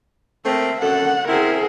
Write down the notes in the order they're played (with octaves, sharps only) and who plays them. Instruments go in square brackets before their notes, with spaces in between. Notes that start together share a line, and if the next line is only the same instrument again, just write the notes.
[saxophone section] A3 A#3 C4 [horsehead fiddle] E5
[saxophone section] F#2 A4 [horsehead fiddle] F#5
[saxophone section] C4 E4 [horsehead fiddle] G#4 A#4